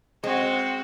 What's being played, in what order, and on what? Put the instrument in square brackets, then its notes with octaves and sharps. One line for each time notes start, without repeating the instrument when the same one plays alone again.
[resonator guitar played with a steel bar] G#3 [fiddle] C4 F#4